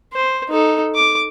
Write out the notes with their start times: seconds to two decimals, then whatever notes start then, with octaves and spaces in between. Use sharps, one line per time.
0.13 C5
0.50 D#4 A4
0.95 D6